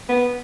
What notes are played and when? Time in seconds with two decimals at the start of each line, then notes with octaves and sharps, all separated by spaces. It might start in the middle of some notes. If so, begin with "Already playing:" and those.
0.09 B3